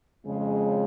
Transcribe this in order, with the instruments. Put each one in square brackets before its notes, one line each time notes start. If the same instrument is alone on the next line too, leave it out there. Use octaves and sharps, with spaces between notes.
[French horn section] F2 C#3 G#3